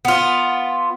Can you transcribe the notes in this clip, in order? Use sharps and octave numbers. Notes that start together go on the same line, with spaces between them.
B3 F4